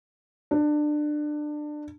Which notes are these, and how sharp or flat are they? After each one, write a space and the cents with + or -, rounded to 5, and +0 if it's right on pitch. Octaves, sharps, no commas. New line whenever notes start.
D4 +25